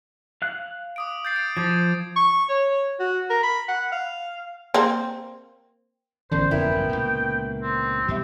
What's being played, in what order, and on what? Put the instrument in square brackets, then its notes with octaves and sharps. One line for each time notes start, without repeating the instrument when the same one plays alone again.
[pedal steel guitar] F5 F#6
[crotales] D6 D#6 D7
G6 A6 C7
D7
[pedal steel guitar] F3 [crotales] D6 G#6 A6
[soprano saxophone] C#6
C#5
F#4
A#4
B5
F#5
F5
[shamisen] A#3 C4
[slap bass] A1 E2 D#3 [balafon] D3 C#4 D5 [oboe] C5
[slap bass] E1 F2 A#2 [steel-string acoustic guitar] B3 E4 A#4 [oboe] G5
[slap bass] B1 G2
C#2 A#2
[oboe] C4
[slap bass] D2 B2 G3 [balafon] G4 E5